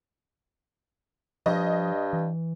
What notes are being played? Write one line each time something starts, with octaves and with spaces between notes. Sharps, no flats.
G2 F3 D#5
E3